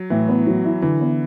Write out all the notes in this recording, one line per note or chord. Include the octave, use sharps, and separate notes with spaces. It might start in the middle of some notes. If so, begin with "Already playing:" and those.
Already playing: F#3
A2 E3
B3
F#3
E4
D3 E3
B3